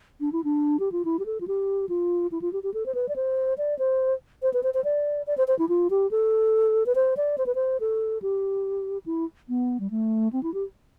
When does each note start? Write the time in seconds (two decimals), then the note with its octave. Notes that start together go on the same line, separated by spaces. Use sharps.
0.21 D4
0.32 E4
0.44 D4
0.80 G4
0.92 F4
1.05 E4
1.19 G4
1.26 A4
1.41 F4
1.47 G4
1.89 F4
2.32 E4
2.42 F4
2.53 G4
2.63 G4
2.74 A4
2.86 C5
2.95 B4
3.09 D5
3.16 C5
3.58 D5
3.79 C5
4.42 C5
4.53 B4
4.63 C5
4.74 C5
4.84 D5
5.27 D5
5.38 C5
5.48 C5
5.59 E4
5.69 F4
5.90 G4
6.11 A4
6.86 B4
6.95 C5
7.17 D5
7.38 C5
7.46 B4
7.55 C5
7.80 A4
8.22 G4
9.06 E4
9.49 B3
9.80 G3
9.90 A3
10.33 C4
10.43 E4
10.54 G4